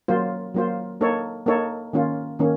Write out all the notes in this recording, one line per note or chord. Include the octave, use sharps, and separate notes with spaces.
F#3 A#3 F4 C5
F#3 A#3 F4 C5
A#3 D#4 A4 C#5
A#3 D#4 A4 C#5
D#3 A#3 C#4 F4
D#3 A#3 C#4